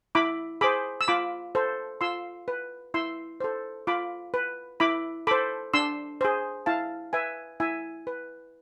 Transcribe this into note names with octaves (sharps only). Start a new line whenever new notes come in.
E4 B5 D6
G#4 C5 B5 D6
E6
F4 B5 D6
A4 C5
F4 C6 E6
B4
E4 C6 E6
A4 C5
F4 B5 D6
B4
E4 B5 D6
A4 C5 B5 D6
D4 C6 E6
G#4 C5
E4 F5 A5
B4 E5 G#5
E4 E5 G#5
B4